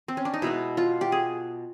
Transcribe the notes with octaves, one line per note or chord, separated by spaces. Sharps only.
C4
C#4
D4
D#4
B2 G#3 B3 E4
F4
G4
G#4